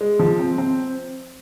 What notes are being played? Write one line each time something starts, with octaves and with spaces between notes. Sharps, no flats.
G#3
F3
C4
C4